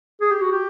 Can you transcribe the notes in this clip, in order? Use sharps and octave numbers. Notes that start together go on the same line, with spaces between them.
G#4
G4
F#4
G4